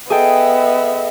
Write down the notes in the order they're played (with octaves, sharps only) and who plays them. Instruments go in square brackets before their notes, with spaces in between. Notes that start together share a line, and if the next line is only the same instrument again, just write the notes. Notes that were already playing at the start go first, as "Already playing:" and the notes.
[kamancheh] B3 E5 [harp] G#4 A4 G5 [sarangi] D#5